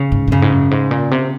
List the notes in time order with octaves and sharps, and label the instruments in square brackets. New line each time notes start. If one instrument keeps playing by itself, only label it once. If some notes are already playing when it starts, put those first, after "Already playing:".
Already playing: [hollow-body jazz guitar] C#3
[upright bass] G#2
G#2
[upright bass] F#2 [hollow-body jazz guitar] C#3
[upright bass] G#2
F#2
G#2
A#2
C3